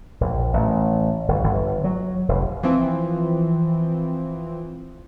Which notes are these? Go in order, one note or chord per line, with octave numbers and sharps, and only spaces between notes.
A#1
A1
G1
G1
F#3
F1
E3 F3 C4